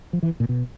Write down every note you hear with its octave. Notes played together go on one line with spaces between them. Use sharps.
F3
E3
A#2
B2